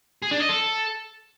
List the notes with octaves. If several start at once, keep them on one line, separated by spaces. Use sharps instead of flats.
G#4
D4
D#5
A4